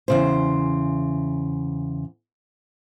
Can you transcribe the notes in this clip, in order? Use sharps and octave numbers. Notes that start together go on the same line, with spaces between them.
E2 C#3 C5